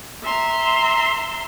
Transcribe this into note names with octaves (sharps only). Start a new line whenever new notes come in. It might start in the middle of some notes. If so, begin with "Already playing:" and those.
E5 A#5 C6